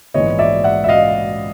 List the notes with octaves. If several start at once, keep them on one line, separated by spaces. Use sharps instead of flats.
A#1 G#2 E3 G#3 B3 C#5 D#5
D5 E5
E5 F#5
E5
D#5 F5